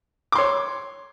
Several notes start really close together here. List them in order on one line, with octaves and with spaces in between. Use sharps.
D6 C6 C#5